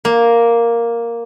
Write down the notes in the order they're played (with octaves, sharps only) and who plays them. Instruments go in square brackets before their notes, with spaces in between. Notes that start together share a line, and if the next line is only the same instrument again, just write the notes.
[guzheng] A#3